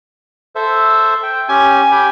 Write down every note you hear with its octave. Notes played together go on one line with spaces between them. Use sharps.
A4 C5 E5
G5
C#4 G4 G#5
G4 G5 B5